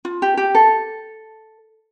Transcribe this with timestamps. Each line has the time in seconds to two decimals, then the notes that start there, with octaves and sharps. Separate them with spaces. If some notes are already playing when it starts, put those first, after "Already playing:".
0.05 F4
0.22 G4
0.37 G4
0.55 A4